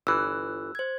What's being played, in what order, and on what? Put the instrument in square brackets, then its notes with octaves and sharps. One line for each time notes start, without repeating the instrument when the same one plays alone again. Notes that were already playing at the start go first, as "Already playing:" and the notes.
[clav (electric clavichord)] G1 E3 [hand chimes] E6 F#6
[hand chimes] C5 G#6